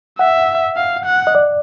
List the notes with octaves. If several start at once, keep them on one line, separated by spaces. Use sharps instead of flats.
E5 F#5
F5
F#5
D#5
D5